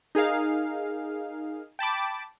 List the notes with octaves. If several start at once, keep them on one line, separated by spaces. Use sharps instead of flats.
D#4 G#4 A#4 F5
G5 A5 B5 D6